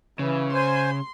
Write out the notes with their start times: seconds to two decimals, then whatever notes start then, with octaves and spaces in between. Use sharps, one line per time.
0.19 C#3 E3
0.54 C5 G#5 C6